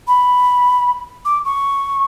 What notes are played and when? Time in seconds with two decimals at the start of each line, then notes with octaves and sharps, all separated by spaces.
0.07 B5
1.25 D6
1.45 C#6